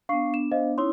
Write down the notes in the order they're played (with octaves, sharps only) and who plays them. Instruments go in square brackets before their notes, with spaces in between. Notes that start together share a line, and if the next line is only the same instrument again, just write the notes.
[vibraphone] B3 D4 [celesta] F5 C#6 C7
[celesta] E7
C5 D#5 F5
[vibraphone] C#4 D#4 E4 [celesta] C#5 C6